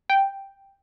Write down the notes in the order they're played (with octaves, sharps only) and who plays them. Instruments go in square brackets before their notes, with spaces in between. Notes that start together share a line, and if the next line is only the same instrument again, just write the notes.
[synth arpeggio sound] G5